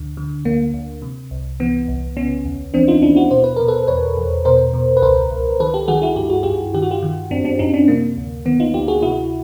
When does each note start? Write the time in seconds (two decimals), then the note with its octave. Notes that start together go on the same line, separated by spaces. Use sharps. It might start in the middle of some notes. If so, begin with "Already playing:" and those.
Already playing: D2 D3
0.17 D3
0.45 D2 A#3
0.74 D2
1.02 C3
1.31 C2
1.60 E3 B3
1.88 C2
2.17 C#3 B3 C#4
2.45 D#2
2.74 E3 C4 D4
2.88 D#4 F4
3.02 D#2 D4 E4
3.16 E4 F#4
3.31 B2 C5
3.44 B4
3.56 B2 A#4
3.68 A4 B4
3.88 E2 B4 C#5
4.17 E2
4.45 B2 A#4 C5
4.74 B2
4.97 B4
5.02 C#2 A#4 C5
5.31 C#2
5.60 D#3 A4 B4
5.74 G4 A4
5.88 D#3 F#4 G#4
6.02 E4 F#4
6.16 G2 G4
6.30 F#4
6.43 G2 F4 G4
6.74 D#3 G4
6.82 F#4
6.91 F4 G4
7.02 D#3
7.31 F#2 C4 D4
7.45 C4 D4
7.59 F#2 C#4 D#4
7.74 C4 D4
7.88 C3 A#3
8.17 D2
8.45 D#3 B3
8.60 D#4 F4
8.74 D2 F4 G4
8.88 F#4 G#4
9.02 C3 E4 F#4